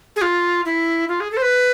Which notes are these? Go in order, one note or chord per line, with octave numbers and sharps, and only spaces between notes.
G#4
F4
E4
F4
G#4
A4
C5
B4